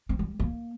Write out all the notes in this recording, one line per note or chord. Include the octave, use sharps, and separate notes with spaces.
C4
G3
A#3